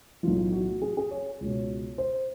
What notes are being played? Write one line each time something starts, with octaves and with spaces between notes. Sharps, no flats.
B1 A2 E3 F4
F#4
G#4
G#4
C#5
C#2 B2
C5